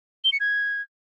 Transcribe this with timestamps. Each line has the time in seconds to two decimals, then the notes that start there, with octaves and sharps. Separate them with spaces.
0.24 G7
0.32 C#7
0.40 G#6